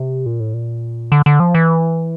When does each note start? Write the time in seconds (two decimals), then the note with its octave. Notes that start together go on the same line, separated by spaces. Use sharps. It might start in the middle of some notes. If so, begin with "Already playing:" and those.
Already playing: C3
0.26 A#2
0.40 A2
0.54 A#2
1.12 D3
1.26 D3
1.40 F3
1.55 E3